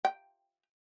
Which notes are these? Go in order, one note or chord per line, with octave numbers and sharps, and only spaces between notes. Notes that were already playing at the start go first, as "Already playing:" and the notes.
G5